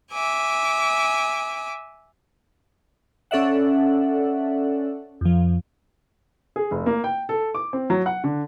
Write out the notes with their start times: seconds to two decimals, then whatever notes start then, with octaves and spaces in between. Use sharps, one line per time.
0.13 E5 G#5 D6
3.31 C#4 A4 D5 E5 F#5
5.21 F2 F3
6.56 G#4
6.71 F1
6.86 A#3
7.04 G5
7.29 A4
7.55 D6
7.73 C4
7.90 F#3
8.06 F#5
8.24 D3